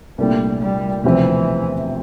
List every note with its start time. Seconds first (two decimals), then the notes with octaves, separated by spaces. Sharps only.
0.18 C2 A#2 G3 A3 D4
0.61 G3
1.04 E1 D2 C3 E3 F3 C4